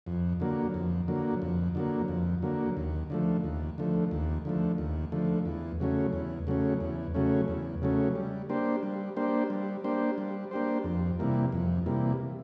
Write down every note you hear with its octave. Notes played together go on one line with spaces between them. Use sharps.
F2
D3 F#3 A#3
F2
D3 F#3 A#3
F2
D3 F#3 A#3
F2
D3 F#3 A#3
D#2
D3 F3 A3
D#2
D3 F3 A3
D#2
D3 F3 A3
D#2
D3 F3 A3
E2
C#3 F#3 A3 C#4
E2
C#3 F#3 A3 C#4
E2
C#3 F#3 A3 C#4
E2
C#3 F#3 A3 C#4
G3
A#3 D4 G4 C5
G3
A#3 D4 G4 C5
G3
A#3 D4 G4 C5
G3
A#3 D4 G4 C5
F2
C3 E3 G3 A#3
F2
C3 E3 G3 A#3